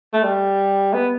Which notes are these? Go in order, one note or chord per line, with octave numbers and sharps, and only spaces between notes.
A3
G3
B3